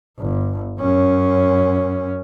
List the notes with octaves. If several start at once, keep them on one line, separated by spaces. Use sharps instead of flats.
G1
F#2 C#4